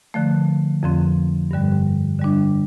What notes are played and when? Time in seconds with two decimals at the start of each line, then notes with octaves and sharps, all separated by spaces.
0.14 D3 F3 A3
0.83 F2 D3 F3 C4
1.51 G2 D3 G3
2.19 D3 G3 D4